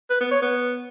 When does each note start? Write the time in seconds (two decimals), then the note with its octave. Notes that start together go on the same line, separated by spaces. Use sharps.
0.10 B4
0.21 B3
0.31 C#5
0.42 B3